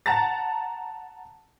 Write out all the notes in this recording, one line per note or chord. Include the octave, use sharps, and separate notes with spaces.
F#5 A5 A#5 A6